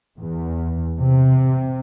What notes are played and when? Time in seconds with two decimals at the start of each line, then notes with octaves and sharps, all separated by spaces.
0.19 E2
1.00 C3